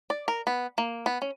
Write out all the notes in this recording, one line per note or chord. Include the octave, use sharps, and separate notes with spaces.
D5
A#4
B3
A#3
B3
C#4